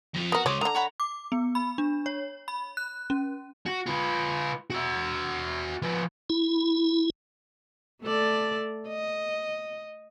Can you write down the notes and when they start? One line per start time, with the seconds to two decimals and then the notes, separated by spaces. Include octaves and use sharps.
0.14 F2 F3
0.32 B3 F#4 A#4 A#5
0.46 C#3 G#3 C5 C#5 D6 D#6
0.61 D3 D#3 A#5
0.75 C#5 F#5 B5
1.00 D6
1.32 B3
1.55 B5
1.78 D4
2.06 C#5
2.48 B5
2.77 F#6
3.10 C#4
3.66 F#4
3.86 F4 B4
4.70 F#4 E5
5.82 F3 B4
6.30 E4
8.02 A3 A4 D5
8.87 D#5